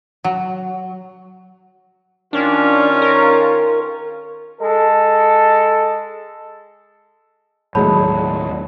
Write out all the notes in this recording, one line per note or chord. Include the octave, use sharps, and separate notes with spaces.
F#3
D#3 C#4 D4 F4
A#4
G#3 A4
D#2 A2 F#3 G#3 C#5 A5 B5